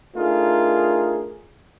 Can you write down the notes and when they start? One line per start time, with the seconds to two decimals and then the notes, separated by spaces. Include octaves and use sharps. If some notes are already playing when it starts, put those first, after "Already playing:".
0.16 A3 D4 D#4 F4 G#4 A#4